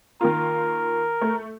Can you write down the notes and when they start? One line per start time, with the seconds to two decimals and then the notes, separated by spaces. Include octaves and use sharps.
0.21 D#3 A#3 F4 A#4
1.21 A3